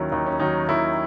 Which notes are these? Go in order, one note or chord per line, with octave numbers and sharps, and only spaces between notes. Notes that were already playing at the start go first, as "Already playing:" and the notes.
Already playing: D#2 D#3 F#3 C#4 E4
D#2 D#4
C#4
D#3 F#3 D#4
D#2 E4